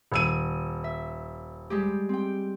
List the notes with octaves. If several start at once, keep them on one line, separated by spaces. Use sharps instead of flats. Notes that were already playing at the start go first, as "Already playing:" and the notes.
D#1 E6 D#7
E5
G3 G#3 G4
C4 G5